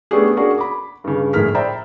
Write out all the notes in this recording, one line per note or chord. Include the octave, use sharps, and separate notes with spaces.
A3 B3 C#4 D4 G4 G#4
A#3 C#4 D4 F#4 G#4
B5 D6
G2 C#3
A#1 A2 G#4 A#4 F6 B6
C5 D5 E5 G5 A#5 B5